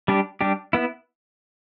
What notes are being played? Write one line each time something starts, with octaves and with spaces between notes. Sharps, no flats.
G3 D4 G4
G3 D4 G4
B3 E4